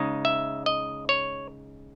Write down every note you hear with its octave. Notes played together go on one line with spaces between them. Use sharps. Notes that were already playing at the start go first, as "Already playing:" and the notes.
Already playing: C#3 G#3 D#4
E5
D#5
C#5